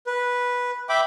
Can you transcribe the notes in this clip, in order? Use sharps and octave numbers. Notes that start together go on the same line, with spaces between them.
B4
E5 G5 B5 D6